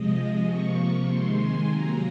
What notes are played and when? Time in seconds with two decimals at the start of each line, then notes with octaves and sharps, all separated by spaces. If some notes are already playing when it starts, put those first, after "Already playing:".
Already playing: C3 F3 G#3 D#5
0.47 C3 F3 A#3 C#6
1.07 C3 D#3 G#3 C6
1.38 G#5
1.68 C3 F#3 A#3 A#5